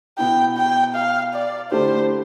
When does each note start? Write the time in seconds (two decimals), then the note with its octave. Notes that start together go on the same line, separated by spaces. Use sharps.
0.18 B2 B3 E4 G5
0.57 G5
0.96 F5
1.34 D5
1.71 D3 A3 E4 G4 C5